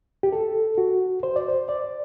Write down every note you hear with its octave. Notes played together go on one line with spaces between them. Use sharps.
G4
A4
F#4
C5
D5
C5
D5